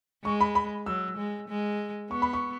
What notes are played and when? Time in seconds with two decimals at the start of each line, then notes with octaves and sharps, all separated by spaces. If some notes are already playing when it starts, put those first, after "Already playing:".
0.24 G#3 C#6
0.41 B5
0.55 B5
0.86 F#3 E6
1.18 G#3
1.49 G#3
2.11 B3 C#6
2.22 B5
2.33 C#6